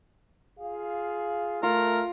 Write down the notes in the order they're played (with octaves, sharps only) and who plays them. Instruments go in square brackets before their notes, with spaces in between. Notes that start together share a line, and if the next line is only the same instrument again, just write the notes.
[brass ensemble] F4 G#4 F5
[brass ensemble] A3 [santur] F4 [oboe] A#4